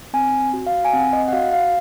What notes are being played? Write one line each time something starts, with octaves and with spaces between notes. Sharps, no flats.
C4 G#5
F#4
F5
G#5
C4 F#5
D#5
F#5
F#4 F5
F5